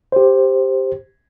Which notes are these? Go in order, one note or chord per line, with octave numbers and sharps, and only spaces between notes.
G4 C5